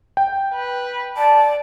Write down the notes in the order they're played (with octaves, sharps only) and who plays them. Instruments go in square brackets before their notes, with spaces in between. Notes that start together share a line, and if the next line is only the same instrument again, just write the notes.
[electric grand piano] G5
[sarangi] B4
[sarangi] D5 [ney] A5